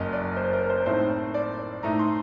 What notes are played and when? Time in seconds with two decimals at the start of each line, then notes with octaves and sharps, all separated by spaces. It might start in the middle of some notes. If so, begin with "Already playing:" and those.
Already playing: F#1 F#2 F#3 D#5
0.13 D5
0.37 C5
0.53 A#4
0.70 C5
0.86 A2 A3 C4 D#4 C5
1.34 D5
1.83 A2 A3 D#4 A#5
1.99 C6